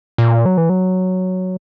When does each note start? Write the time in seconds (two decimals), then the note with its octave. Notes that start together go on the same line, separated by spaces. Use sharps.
0.18 A#2
0.45 F#3
0.57 E3
0.70 F#3